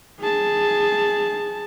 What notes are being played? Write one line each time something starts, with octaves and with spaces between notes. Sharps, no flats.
G#4 A5